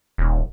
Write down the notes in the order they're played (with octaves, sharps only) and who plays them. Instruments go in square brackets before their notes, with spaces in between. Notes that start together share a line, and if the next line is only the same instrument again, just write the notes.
[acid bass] D#1